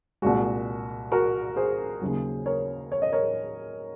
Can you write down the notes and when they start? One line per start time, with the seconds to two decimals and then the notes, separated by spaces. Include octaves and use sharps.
0.22 C2 A#2 G#3 F#4
1.12 F#4 A#4
1.56 G#4 C5
2.02 D#2 C#3 F#3
2.46 A#4 C#5
2.92 C#5
3.02 D#5
3.13 A#4 C#5